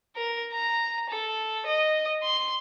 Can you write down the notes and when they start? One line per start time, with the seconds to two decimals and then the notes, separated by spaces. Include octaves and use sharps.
0.16 A#4
0.53 A#5
1.09 A4
1.67 D#5
2.23 C6